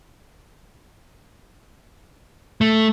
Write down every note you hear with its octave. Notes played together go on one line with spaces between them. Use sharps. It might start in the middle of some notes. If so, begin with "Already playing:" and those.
A3